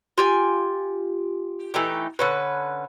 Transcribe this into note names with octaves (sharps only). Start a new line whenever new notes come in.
F4 G4 G#5
E3 A3 D#4 G4
D3 C#4 B4